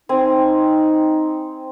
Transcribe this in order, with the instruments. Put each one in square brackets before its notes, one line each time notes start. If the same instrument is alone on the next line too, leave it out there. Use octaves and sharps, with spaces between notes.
[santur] C4 G#5 [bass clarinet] D#4